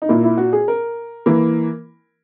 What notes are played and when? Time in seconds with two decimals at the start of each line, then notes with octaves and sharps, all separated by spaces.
0.02 D#4
0.09 A#2 A#3 E4
0.23 E4
0.38 F#4
0.53 G#4
0.68 A#4
1.26 E3 A#3